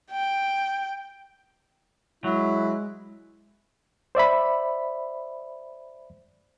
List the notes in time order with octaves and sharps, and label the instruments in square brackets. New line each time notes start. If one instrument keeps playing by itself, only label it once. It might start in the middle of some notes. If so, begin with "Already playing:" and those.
[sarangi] G5
[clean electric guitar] F#3 [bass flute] G#3 [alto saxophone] E4
[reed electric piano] C5 D5 E5 B5